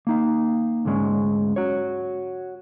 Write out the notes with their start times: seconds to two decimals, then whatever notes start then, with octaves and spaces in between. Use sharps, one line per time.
0.07 A#3 D#4 F5
0.85 D2 G#2 G#3 C#4
1.56 F#4 C#5